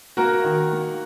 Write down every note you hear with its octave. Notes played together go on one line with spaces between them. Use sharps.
A#3 F#4 A#4
D#3
A#3